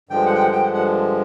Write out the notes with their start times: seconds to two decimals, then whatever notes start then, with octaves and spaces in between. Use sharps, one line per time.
0.09 G2 D3 F3 G#3 G5
0.26 F#5
0.35 G5
0.41 F#5
0.52 G5
0.63 F#5
0.74 F#5